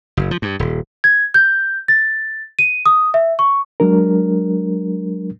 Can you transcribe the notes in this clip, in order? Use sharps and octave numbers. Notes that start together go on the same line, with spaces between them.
F#1
F3
G2
D#1
G#6
G6
A6
D#7
D#6
E5
C#6
F#3 G#3 D4 A#4